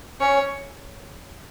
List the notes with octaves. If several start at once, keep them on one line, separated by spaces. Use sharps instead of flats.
C#4 C#5